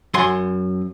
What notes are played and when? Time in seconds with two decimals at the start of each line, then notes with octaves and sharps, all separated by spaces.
0.14 F#2 F#5 G#5 C6